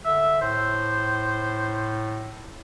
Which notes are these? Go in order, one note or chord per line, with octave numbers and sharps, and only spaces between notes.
D3 E5
A2 C5